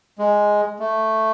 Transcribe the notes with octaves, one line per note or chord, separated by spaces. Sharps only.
G#3
A3